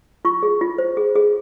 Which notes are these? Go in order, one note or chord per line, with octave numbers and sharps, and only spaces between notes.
F4 C#6
G#4
F4
C5
G#4
G#4